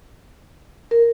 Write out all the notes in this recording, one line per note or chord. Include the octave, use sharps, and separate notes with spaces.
A#4